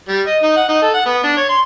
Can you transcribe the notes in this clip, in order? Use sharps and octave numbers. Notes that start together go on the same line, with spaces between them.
G3
D#5
D#4
F#5
D#4
A4
F#5
B3
D4
C#5
C6